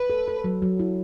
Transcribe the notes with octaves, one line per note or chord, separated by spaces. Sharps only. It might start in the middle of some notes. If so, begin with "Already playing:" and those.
Already playing: B4
A4
A4
F#3
F#3
E4